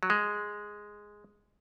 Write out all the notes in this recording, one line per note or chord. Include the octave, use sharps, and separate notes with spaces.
F#3
G#3